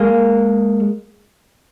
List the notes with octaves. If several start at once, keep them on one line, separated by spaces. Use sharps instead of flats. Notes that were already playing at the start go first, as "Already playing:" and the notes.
Already playing: G#3 A#3